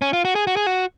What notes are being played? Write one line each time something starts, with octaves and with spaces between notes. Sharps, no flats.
C#4
F4
F#4
G#4
F#4
G#4
F#4